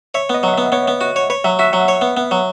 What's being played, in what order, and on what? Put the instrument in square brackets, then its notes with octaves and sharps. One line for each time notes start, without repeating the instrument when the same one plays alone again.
[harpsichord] C#5 [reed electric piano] E5
[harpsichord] B3 [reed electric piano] D#5
[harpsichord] F#3 [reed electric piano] F#5
[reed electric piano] E5
[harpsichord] B3
[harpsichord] B3 [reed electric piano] C#5
[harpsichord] B3
F#4
C#5
[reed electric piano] B4 [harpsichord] C#5
[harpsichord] F#3 [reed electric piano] E5
[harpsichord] F#4 [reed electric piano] E5
[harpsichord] F#3 [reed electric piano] F#5
[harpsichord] C#5
B3
B3
F#3